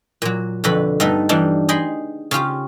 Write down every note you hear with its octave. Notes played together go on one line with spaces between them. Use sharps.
A#2 F#3
F2 B2 D3 B4 B5
G2 A3 B3 D#4 A4 D#5
E3 G3 D4 D#4
G#4 D#5 G5 B5 C6
C#3 C#4 F4 G4